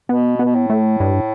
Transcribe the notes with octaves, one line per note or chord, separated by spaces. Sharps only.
B2 B3
B3
B2
A2
A3
G2